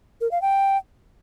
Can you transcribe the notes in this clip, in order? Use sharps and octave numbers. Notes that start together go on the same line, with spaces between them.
A#4
F5
G5